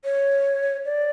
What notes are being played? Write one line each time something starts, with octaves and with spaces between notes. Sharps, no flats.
C#5
D5